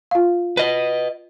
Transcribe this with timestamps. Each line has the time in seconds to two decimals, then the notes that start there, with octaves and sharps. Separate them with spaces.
0.11 F4 F5
0.57 B4 D#5